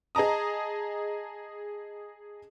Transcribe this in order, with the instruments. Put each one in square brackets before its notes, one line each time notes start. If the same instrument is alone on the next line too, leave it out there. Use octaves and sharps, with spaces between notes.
[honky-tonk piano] G#4 D#5 A5 A#5 D#6